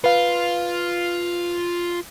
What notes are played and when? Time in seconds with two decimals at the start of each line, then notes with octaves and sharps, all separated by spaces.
0.04 F4 B4 F5